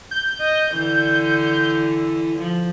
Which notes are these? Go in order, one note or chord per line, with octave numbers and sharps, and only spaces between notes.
G6
D#5
D3 E3
F3